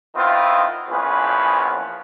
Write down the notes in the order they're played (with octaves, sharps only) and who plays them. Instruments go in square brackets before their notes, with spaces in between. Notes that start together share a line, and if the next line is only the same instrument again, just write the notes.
[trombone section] D#3 B3 C4 E4 F4
A#1 E2 F3 C#4 G#4 B4